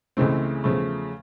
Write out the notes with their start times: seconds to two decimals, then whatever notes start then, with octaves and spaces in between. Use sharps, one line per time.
0.17 C#2 C#3 E3 A3 C4
0.64 E2 C#3 F3 A3